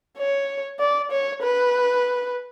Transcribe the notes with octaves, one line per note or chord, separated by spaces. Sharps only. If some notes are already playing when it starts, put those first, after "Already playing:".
C#5
D5
C#5
B4